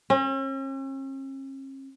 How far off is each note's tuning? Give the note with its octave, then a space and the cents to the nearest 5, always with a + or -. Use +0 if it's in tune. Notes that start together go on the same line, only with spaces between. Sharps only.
C#4 -45